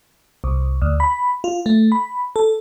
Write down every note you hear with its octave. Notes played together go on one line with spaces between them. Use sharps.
C2
D2
B5
F4
A3
B5
A4